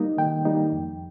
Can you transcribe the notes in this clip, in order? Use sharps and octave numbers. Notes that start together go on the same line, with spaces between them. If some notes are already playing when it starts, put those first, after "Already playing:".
Already playing: G3 A#3 D#4 D#5
D#3 G5
G3 A#3 D#4
F2